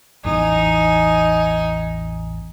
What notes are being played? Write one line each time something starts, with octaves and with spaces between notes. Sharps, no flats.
A1 E2 E3 D#4 G#5